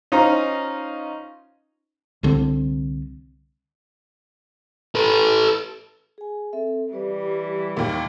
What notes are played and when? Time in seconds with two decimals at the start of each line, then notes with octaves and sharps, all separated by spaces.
0.12 C#4 D#4 F4 C5 A#5
2.23 C2 D3 F3 C4
4.95 A4 B4
6.18 G#4 G#5
6.53 C4 A4 E5
6.92 E3 G3 G4 B4 D5
7.77 D#2 A#2